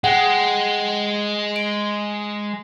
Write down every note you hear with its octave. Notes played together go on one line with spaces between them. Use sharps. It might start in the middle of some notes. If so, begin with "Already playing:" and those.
G#3 F#5 G5
D7